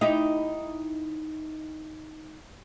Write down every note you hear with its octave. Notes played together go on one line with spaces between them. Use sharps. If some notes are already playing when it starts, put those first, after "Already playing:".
D#4 E4 G4